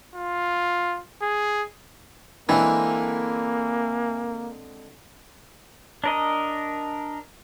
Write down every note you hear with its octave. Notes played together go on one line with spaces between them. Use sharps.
F4
G#4
D3 E3 G#3 A#3 C4
D4 A#4 D#5